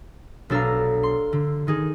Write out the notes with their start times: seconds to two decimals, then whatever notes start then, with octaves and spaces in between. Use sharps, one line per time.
0.50 B1 D4 A4 F5 A#5
1.03 C6
1.33 D3
1.67 D#3 D#4 G#4